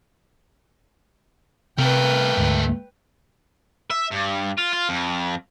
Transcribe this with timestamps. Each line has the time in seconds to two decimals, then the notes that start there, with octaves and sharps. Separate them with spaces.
1.78 C3 A3 A#4 B4 G5
2.37 D2 G#2
3.90 E5
4.11 G2
4.58 F4
4.73 F4
4.89 F2